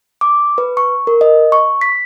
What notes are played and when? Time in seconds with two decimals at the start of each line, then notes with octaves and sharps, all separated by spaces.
0.21 D6
0.58 B4
0.77 C#6
1.07 A#4
1.21 D#5
1.52 C#6
1.81 B6